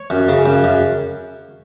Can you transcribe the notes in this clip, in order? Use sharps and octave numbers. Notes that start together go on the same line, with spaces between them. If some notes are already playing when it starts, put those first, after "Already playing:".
Already playing: C#5
F#2
C#3
F#2
F#2